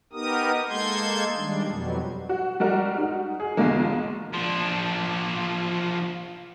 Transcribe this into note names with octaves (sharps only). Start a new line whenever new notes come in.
B3 D#4 G4 A#4 D#6
G#3 A#3 A4 C6 G6 G#6
D#3 G3 G#3 D4
F2 B2 F#3 G3
F#4
G3 G#3 F#4 A#4
D#4 F#4
G#4
B1 E2 D3 F3 G#3 A#3
F3 D4